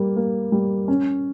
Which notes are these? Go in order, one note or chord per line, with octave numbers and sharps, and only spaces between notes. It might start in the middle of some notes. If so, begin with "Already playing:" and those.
Already playing: G3 A#3
A#3
G3
C#4